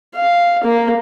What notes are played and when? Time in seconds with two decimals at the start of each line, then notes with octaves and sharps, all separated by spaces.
0.15 F5
0.64 A#3